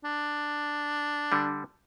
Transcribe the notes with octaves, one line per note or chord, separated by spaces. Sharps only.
D4
D3 G3